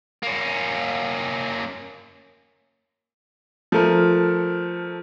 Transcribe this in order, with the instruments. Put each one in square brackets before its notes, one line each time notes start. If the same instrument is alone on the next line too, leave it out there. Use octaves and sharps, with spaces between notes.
[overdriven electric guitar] A#3 C#4
[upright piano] F3 A3 A4 A#4